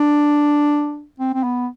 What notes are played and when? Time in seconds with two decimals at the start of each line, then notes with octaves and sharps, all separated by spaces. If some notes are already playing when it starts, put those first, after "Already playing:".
Already playing: D4
1.20 C4
1.34 C4
1.43 B3